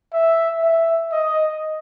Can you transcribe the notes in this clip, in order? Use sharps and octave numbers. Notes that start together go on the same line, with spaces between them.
E5
E5
D#5